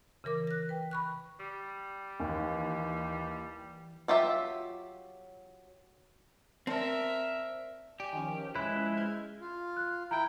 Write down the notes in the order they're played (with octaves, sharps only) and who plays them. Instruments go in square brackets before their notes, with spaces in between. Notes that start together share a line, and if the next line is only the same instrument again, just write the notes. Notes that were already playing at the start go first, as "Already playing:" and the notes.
[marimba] C#3 E3 A#4 D6
F#6 A#6
B4 G5
B5 C#6 F#6
[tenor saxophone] G3
[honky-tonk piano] D#2 [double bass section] E3
[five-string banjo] F#3 F4 G4 E5
[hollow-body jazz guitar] C4 [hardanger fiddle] A#4 E5 [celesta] D5 A5
[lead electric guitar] G4 [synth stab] D5 G#5
[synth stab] D#3 F3 C#4
[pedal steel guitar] G#3 B4 [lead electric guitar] E4
[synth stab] F3 C#4
F6 G6 G#6
[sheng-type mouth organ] F4
[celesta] F#6
[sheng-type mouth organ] E4 G5 [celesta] A#5 D7